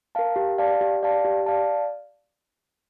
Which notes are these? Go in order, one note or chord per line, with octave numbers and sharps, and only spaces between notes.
A#4 F5 A5
G4
D5 F5 A5
G4
D5 F5 A5
G4
D5 F5 A5